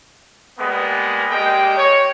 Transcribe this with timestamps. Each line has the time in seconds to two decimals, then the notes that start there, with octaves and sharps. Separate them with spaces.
0.59 G3 G#3 A#3 B3
1.31 G3 G#3 A#3 G4 D#5 G5
1.77 C#5